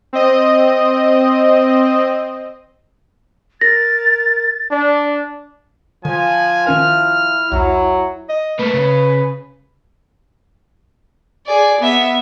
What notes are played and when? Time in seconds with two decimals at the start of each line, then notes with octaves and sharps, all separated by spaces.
0.13 C4 D#5
3.61 A#4 A6 A#6
4.71 D4 D5
6.05 D3 F3 G#5
6.67 D#3 C#4 E4 A#4 F6
7.52 B1 E2 F#3
8.29 D#5
8.59 A3 A#3 B4
8.74 C#3
11.46 G#4 D5
11.80 B3 E5